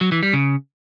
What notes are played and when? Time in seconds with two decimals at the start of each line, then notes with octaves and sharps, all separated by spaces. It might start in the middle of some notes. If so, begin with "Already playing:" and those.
0.01 F#3
0.12 E3
0.23 G3
0.33 C#3